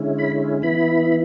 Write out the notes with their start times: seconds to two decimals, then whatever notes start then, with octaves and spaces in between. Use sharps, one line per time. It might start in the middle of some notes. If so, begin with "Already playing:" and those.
Already playing: D3 G#3 C#4 E4
0.18 B5
0.62 E3 B3 E4 B5